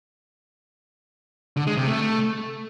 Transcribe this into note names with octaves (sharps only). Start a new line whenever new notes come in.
D3
G#3
C3
A3